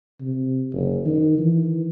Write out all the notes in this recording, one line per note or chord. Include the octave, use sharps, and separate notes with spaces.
C3
F#1
D#3
E3